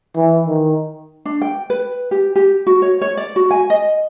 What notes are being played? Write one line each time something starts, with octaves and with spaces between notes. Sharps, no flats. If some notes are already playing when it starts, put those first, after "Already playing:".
E3
D#3
D4
G5
B4
G4
G4
F#4
C#5
C#5
D5
F#4
G#5
D#5